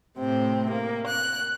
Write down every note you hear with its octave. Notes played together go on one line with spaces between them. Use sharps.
A2 C3 C4
A#3
F#6